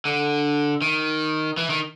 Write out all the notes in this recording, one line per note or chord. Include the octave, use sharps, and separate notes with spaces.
D3
D#3
E3
D#3